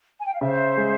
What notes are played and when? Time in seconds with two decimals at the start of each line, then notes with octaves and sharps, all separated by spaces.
0.20 G#5
0.26 G5
0.34 F5
0.41 C#3 C5 E5
0.77 G#3